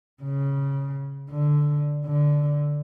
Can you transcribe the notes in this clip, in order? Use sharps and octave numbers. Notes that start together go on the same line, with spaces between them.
C#3
D3
D3